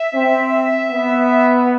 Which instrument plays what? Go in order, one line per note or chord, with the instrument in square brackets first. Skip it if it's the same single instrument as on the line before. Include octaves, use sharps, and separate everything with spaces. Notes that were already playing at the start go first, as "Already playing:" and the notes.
Already playing: [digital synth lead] E5
[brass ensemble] C4
B3